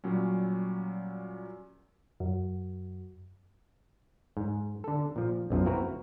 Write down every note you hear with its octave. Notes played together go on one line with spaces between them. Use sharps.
A#2 F#3 G3 C#4
F#2
G#2
D3 A4
A#2 F3
B1 F#2 F3
A#3 C4 E4 F#4 A#4 B4